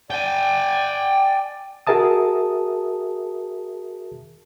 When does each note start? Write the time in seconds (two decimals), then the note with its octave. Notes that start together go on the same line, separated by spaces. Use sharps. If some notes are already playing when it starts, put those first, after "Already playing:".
0.11 D5 G5 G#5
1.87 F#4 G#4 A#4 E5 A5 D#6